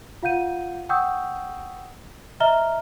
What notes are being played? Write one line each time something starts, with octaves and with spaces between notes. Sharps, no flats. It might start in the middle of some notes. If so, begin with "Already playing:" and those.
F4 F5 F#5 G6 D#7
F#5 G5 C#6 D#6 E6 G6
D#5 E5 A#5 F6 G7